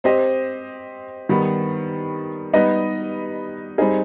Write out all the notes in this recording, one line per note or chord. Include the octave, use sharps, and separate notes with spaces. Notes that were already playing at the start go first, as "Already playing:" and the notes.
C4 G4 C5 D#5
D#3 G3 B3
G3 B3 D#4 B4 D#5
G3 C4 D#4 G#4